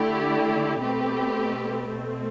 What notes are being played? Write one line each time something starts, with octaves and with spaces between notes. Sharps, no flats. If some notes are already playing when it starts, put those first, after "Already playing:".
Already playing: D3 A3 E4 G4 D5
B2 A3 C4 G4 B4
B2 A3 C4